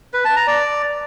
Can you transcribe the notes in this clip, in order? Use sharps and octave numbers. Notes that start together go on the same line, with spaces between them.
B4
A5
A#5
D5